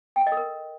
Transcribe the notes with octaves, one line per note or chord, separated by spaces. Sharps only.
G5
F#5
D#5
A4
A#4